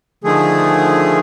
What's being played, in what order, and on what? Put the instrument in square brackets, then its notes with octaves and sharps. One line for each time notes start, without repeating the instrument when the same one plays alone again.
[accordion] D3 D#3 F3 A3 G#4